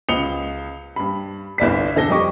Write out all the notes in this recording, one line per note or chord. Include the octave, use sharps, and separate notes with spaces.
C#2 D#6 C#7 F7 G7
G2 B5
G1 C2 D5 B6
E1 D4 A4 A#6 G7
F2 G3 D#5 C#6 D6